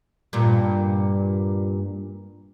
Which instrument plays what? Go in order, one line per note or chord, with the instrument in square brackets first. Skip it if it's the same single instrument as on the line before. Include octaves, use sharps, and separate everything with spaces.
[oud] G2 A#2